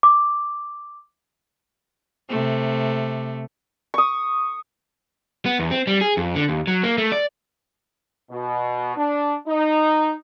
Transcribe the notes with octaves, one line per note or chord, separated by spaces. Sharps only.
D6
C3 A3
C#6 D#6
B3
E2
C4
G3
G#4
F2
D3
D#2
F#3
A#3
A3
D5
B2
D4
D#4